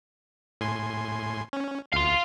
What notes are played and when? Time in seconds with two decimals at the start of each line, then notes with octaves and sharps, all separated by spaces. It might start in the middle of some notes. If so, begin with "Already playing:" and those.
0.61 A2 G#5 C6
1.53 C#4
1.93 D2 F5 C6